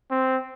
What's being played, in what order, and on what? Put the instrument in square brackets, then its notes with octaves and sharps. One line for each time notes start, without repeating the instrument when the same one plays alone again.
[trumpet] C4